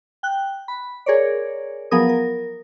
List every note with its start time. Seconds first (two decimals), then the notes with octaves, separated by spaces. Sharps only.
0.23 G5 F#6
0.68 B5
1.06 G#4 A#4 C#5 D5
1.91 F3 F#3 B3 G#4 A#4 D#6
2.09 A#4